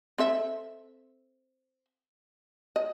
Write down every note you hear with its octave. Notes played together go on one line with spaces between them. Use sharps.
C4 A4 E5
D#5